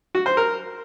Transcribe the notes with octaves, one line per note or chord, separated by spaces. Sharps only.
F#4
C5
A#4